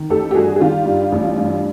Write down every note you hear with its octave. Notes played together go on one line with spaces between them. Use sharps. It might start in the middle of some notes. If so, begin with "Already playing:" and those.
Already playing: D#3
A1 G4 A4
G4
G2 F#4 G#4
G#4
D#3 F4 G4
G2
A1
G2